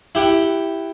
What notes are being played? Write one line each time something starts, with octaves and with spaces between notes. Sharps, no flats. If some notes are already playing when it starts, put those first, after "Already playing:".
E4 G4 F#5 G5